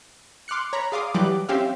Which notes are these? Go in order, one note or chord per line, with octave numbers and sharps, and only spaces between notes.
C6 D6 F6 F#6 C#7
C#5 A#5 B5
G#4 D5 F5 C6 D6 D#6
E3 F#3 G3 G4 D6 F#6
C4 C#4 G4 E5 F5